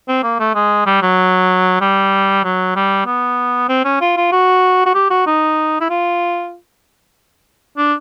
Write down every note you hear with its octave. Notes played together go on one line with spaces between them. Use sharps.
C4
A#3
A3
G#3
G3
F#3
G3
F#3
G3
B3
C4
C#4
F4
F4
F#4
F#4
G4
F#4
D#4
E4
F4
D4